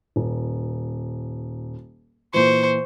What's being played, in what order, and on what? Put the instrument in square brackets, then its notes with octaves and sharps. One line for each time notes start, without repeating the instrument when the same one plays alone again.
[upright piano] D#1
[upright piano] A#2 E3 [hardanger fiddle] C5 C#6